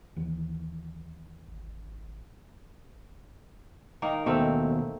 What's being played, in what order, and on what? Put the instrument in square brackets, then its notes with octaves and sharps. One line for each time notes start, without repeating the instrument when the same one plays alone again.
[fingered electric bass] D#2 E3
[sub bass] G#1
[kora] D#3 A#3 D#4
[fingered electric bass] D#2 B2 [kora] A3 A#3 C4